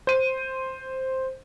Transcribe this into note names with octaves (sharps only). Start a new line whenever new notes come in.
C5 D#7